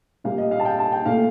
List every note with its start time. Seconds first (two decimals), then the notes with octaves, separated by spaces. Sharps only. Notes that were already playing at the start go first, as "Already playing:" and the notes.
0.24 A#2 G3 A#3 F5
0.38 D#5
0.51 F5
0.60 A5
0.65 G5
0.79 A5
0.92 G5
1.06 A#2 A3 F5